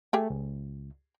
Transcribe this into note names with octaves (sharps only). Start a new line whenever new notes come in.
A3 G4 G#4 G5
C#2